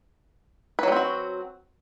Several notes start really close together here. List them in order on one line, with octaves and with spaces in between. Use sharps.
B4 F#3 G3 C4 F#4